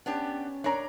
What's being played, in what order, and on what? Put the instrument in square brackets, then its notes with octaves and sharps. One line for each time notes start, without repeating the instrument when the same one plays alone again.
[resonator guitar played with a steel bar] B3 D4 G4 [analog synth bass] C#4
[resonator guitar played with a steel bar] D4 A#4 D5 [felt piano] C#5 A#5